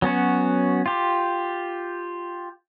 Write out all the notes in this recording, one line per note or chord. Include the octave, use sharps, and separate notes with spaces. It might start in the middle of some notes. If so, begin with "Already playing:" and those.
F#3 B3 C#4 F#4
F4 G4